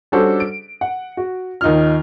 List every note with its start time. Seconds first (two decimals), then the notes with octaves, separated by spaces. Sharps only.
0.12 G3 C#4 D4 F#4 A4 C5
0.40 D7
0.81 F#5
1.17 F#4
1.61 D#2 D#4 F4 F6